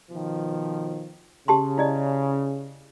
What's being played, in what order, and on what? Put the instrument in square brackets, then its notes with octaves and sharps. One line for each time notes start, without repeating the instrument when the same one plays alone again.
[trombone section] B2 D#3 F3
[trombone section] C#3 [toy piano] G4 A5 C6
[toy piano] E4 D5 D#5